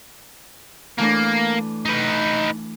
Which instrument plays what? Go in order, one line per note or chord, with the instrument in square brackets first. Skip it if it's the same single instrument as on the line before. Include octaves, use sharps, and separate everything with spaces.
[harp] E3 A3 D4 [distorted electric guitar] A#3
[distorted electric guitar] D#4 B4